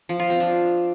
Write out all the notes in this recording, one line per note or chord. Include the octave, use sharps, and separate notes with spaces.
F3
F4
C4
D4